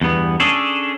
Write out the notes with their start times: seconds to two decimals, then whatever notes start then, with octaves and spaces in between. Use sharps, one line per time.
0.01 E2 G2 B3
0.40 C#4 D4 G#4 A4